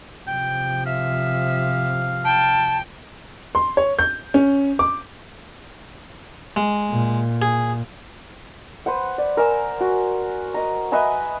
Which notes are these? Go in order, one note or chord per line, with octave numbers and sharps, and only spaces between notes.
C3 F3 G5
E5 F5
G5 A5
C6
C#5
G6
C#4
D6
G#3
A#2
G#4
B4 C5 F#5
D5
A#4 G#5 E6
F#4
D#5 A#5
B4 D#5 E5 G#5